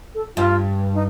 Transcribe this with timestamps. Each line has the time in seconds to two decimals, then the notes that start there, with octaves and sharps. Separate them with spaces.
0.15 A4
0.36 G2 F4
0.94 D#4